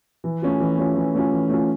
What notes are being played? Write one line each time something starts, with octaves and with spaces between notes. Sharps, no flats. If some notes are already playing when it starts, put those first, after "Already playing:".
E3
A3 C#4 F4
E3
A3 C#4 F4
E3
A3 C#4 F4
E3
A3 C#4 F4